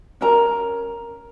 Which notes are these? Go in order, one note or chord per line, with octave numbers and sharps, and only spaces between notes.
C#4 A#4 A#5